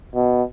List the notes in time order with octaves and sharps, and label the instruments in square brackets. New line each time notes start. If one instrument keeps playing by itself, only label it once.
[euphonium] B2